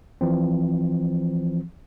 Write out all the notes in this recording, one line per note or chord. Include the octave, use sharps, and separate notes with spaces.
E3 F3 C4